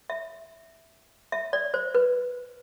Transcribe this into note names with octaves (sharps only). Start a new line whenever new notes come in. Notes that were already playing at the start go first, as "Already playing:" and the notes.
E5
E5
D5
C5
B4